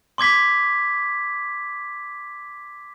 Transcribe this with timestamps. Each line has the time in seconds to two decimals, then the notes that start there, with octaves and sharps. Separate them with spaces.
0.18 C6 D6 G#6 B6